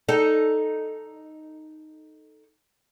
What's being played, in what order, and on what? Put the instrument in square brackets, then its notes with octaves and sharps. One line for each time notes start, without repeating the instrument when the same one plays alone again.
[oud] D#4 A4